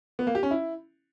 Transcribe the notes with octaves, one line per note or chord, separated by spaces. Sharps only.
B3
A#3
G4
C#4
E4